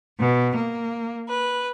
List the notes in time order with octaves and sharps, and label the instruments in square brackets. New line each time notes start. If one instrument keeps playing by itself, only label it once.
[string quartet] B2
A#3
B4